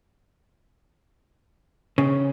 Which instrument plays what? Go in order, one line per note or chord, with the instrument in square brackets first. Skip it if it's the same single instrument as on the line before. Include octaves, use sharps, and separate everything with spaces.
[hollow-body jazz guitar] C#3